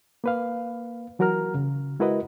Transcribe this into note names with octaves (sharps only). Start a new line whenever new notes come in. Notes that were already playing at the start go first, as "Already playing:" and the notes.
A#3 B4 F5
E3 F#3 F#4 A#4 A#5 F6
C#3
G#3 E4 F#4 A#4 B4 D#5